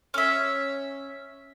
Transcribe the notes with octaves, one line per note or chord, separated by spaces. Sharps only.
C#4 E5